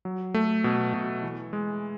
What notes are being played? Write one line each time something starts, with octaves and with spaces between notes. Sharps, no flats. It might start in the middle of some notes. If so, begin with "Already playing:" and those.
F#3
A3
B2
B2
E3
G#3